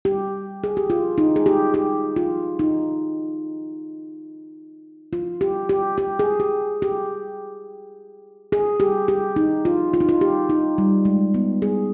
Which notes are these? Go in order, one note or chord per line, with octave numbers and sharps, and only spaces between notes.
G4
G#4
G4
F4
D#4
G#4
G4
G4
F4
D#4
F4
G4
G4
G4
G#4
G4
G4
G#4
G4
G4
D#4
F4
F4
D#4
F4
G4
D#4
G3
G#3
B3
G#4